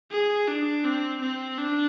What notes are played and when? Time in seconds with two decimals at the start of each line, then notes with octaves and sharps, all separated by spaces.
0.11 G#4
0.48 D4
0.85 C4
1.21 C4
1.58 D4